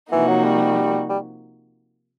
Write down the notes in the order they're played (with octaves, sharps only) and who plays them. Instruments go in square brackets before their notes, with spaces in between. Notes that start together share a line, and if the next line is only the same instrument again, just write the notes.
[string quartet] C3 F3 A#3 D#4 F#4 [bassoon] E3
[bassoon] F#3
G3
G3